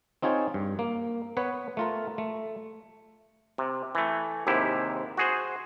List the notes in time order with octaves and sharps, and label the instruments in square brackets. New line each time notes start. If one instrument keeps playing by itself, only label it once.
[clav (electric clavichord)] C4 D#4 F4 G#4 C#5
G2
A#3
B3 B4 C#5
A3 F4 A#4
A3
C3
E3 A3
D#2 G#2 C3 E4 G4
F#4 G#4 C5